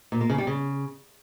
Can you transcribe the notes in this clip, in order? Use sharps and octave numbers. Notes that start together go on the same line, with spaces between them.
A#2
A#3
C#3
G3
C#3